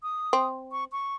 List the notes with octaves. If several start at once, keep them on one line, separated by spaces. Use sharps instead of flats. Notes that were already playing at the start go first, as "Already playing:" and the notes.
D#6
C4
C#6
C#6